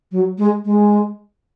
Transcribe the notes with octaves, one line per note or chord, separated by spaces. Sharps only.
F#3
G#3
G#3